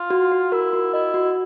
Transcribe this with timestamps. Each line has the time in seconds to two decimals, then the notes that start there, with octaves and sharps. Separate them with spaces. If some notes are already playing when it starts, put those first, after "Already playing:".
Already playing: F4
0.10 F#4
0.31 F#4
0.52 E4 A#4
0.73 F#4
0.94 E4 D#5
1.14 F#4